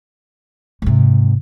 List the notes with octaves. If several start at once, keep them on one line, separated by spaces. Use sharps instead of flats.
G#2 C3